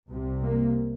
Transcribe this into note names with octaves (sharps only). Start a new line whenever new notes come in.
C2 C3
A#3